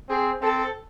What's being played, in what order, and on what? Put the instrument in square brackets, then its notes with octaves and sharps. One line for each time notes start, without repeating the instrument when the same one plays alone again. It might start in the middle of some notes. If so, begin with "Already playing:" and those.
[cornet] C4 [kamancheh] G#4
[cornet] C4 [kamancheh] A4